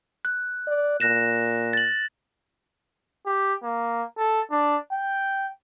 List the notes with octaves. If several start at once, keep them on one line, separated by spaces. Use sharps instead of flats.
F#6
D5
A#2 F#6 A#6 E7
A6 F#7
G4
A#3
A4
D4
G5